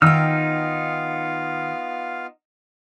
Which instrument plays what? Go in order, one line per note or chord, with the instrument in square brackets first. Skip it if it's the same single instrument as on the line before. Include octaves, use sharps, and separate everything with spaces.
[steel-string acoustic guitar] D#3 G5 [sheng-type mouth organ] B3 F4 F5 [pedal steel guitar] D#4 E6 F6